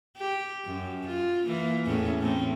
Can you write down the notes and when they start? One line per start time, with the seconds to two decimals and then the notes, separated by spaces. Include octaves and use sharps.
0.17 G4
0.65 F#2
1.07 F4
1.45 E3 A#3
1.85 E2 A2 C#4
2.19 A2 C4